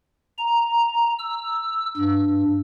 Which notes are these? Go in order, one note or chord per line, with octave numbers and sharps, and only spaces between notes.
A#5
E6
G2